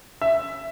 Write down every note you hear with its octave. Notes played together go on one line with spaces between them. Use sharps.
E5